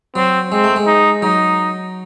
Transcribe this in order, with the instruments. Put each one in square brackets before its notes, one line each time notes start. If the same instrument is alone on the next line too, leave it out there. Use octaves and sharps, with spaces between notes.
[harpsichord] F#3 [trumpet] C4
[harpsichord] G#3 [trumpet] C4
[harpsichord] A3
G#3
[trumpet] D#4
[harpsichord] F#3 [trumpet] D#4